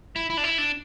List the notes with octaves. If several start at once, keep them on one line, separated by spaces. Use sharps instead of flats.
E4
E4
D4
E4
D4